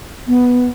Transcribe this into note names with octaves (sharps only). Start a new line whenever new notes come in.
B3